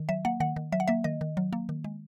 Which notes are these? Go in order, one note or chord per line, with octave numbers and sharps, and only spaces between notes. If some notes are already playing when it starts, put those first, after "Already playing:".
Already playing: D#3
F#3 E5
A#3 F#5
D#3 F#5
D#3
F#3 E5
F#5
A#3 E5
D#3 D#5
D#3
F#3
A#3
D#3
G#3